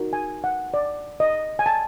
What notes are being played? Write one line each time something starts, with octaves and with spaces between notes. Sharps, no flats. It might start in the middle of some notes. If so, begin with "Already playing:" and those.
Already playing: D#4 F#4 A#4
G#5
F#5
D5
D#5
G#5
A5